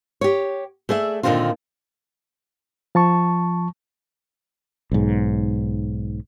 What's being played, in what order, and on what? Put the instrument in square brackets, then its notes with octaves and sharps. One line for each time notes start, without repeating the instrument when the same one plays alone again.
[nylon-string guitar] G4 C#5
A3 G#4 D5 E5
A#2 D3 D#3 C4 D4 F4
[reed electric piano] F3 A5 C#6
[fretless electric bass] B1 G#2